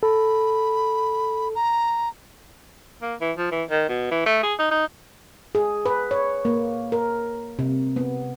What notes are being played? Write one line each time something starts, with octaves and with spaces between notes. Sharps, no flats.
A4 B5
A#5
A#3
E3
F3
E3
D#3
B2
E3
A3
G#4
D#4
D#4
G#4
B4
C#5
A#3
A#4
C3
B3